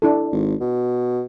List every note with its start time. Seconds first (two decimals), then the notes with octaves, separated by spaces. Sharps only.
0.02 D4 E4 A4
0.32 G#1
0.60 B2